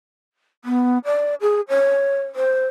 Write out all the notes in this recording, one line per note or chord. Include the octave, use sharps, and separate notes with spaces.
B3
D5
G#4
C#5
C5